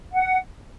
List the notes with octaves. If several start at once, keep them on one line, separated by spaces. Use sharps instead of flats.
F#5